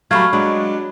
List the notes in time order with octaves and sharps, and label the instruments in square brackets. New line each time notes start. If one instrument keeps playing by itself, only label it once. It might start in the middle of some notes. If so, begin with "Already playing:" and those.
[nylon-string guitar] F#3 G3 [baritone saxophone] A3 [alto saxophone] F5 [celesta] B5 C#6 G#6
[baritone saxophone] F#3 [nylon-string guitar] G#3 [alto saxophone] D4